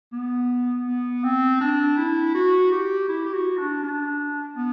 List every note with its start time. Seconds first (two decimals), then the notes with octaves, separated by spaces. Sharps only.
0.12 B3
0.87 B3
1.23 C4
1.61 D4
1.97 E4
2.34 F#4
2.72 G4
3.08 E4
3.25 G4
3.34 F#4
3.58 D4
3.83 D4
4.56 B3